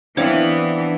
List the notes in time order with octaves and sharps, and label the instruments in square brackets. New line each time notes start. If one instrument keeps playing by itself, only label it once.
[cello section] E3 B3 [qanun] C4 C#5 F5 [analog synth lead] D4